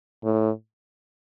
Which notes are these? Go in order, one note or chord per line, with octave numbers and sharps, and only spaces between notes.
A2